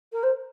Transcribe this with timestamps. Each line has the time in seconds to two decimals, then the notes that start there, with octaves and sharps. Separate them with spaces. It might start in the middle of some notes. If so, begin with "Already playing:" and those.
0.12 A#4
0.23 C5